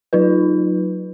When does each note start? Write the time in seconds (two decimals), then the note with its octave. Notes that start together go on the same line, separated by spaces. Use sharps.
0.13 F#3 D#4 F4 B4